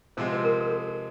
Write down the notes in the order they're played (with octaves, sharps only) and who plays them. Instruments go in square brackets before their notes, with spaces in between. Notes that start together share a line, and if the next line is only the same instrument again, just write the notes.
[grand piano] C3 F3 G#3 C4 [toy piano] C5
[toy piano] B4
A#4
A#4
A4